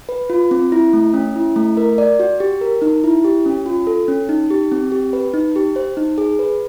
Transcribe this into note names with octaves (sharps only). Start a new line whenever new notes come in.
B4
F4
C4
E4
A3
C#4
E4
A3
A#4
D5
F#4
G4
A#4
D#4
E4
G4
C#4
F4
A4
C#4
D#4
G4
C4
G4
B4
D#4
G4
C5
D#4
G#4
B4